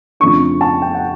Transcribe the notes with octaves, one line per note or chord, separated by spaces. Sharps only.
F2 C#3 F3 A3 D4 C#6
A5
G5
F#5